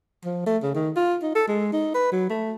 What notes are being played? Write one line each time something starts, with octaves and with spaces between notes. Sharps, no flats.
F3
A3
C#3
D#3
F4
D#4
A4
G#3
D#4
B4
F#3
A3